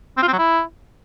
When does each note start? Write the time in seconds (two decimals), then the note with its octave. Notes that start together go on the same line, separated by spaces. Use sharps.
0.17 C4
0.23 F4
0.28 C4
0.33 F#3
0.39 E4